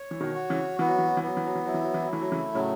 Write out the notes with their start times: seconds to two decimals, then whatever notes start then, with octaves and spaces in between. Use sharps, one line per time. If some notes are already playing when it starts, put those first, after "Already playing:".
Already playing: C#5
0.11 E3
0.20 B2 D#3
0.35 F#4
0.50 C#3 E3
0.79 E3 B3
0.88 F#3
0.98 E3
1.07 F#3
1.17 E3
1.23 F#3 B3
1.37 E3
1.46 F#3
1.55 E3
1.66 F#3 E4
1.74 E3
1.84 F#3
1.94 E3
2.02 F#3
2.11 E3 A3
2.22 F#3
2.32 C#3 E3
2.54 A2 C#3 F#3